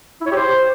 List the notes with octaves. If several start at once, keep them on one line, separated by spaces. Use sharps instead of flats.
E4
C#5
G4
C5